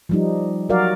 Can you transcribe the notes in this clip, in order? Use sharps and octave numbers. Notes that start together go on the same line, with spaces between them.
F3 G3 D#4
F#3 F#4 A#4 D5 F5